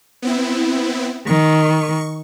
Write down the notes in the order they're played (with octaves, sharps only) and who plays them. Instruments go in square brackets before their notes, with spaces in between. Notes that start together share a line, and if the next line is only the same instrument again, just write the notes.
[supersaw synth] B3 C4 E4
[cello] D#3 [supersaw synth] C#6